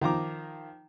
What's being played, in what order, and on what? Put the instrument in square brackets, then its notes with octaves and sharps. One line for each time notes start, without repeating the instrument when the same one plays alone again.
[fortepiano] D#3 F3 A#5 D6